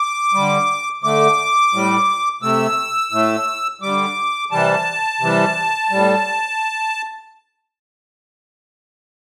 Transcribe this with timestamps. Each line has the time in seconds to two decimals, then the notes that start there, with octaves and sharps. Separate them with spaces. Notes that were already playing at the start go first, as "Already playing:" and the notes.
Already playing: D6
0.34 D3 G3
1.03 D3 A3 D6
1.73 A2 G3
2.42 C3 A3 E6
3.12 A2 A3
3.81 D3 G3 D6
4.51 C3 E3 G3 A5
5.21 C3 E3 G3
5.91 A2 G3